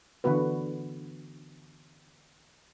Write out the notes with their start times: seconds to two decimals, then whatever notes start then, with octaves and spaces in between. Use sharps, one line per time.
0.24 D3 E3 B3 F#4 B4